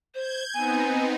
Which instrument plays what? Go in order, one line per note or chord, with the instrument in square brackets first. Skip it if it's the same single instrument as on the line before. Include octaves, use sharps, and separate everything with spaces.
[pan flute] C5 [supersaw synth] G6 G#6
[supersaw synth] B3 C4 D#4 [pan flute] G#5